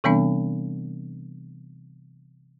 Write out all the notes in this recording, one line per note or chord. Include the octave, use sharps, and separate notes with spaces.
C3 E3 G3 B3 C4 D4